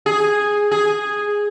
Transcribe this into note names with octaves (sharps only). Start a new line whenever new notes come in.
G#4
G#4